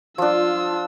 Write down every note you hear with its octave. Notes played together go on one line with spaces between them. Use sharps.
F3 D4 F4 E6